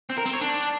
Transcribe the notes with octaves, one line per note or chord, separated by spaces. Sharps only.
C4
A#4
C4
C#5
D4